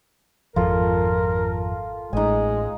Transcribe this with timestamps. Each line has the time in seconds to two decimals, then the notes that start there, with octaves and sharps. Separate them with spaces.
0.56 G#1 F2 F3 F4 A4 A#4
2.13 A1 G#3 D#4 G#5